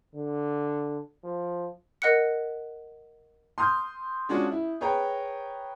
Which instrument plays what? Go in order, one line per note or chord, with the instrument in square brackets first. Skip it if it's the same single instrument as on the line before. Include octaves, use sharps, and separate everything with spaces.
[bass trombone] D3
F3
[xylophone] A#4 D#5 F#5 F#6 C#7
[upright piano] C6 D#6 F6 G6
G#3 C#4 D4 F4 F#4 G#4
E4
G#4 B4 C#5 G5 A#5